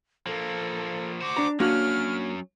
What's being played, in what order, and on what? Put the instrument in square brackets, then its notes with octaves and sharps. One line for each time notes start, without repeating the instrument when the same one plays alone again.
[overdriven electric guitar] F3 A#3 [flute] A4
[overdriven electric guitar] F#4 C5 [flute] D6
[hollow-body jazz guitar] D4 A#5
[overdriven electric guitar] F#3 C#4 [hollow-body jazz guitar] A#3 D4 F#4 [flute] F6